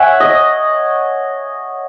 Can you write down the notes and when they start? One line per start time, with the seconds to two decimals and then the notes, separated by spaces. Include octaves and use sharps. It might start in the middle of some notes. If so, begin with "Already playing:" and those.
Already playing: C#5 E5 F#5 G#5
0.20 D#5